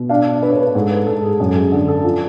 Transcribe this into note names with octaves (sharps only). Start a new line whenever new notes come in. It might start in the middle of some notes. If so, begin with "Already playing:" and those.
Already playing: B2
D4 F5
D4 B4
C#5
B4
G#2 A4
B4
G#2 A4
G#4
F#2 A4
G#4
D3 A4
A4
F3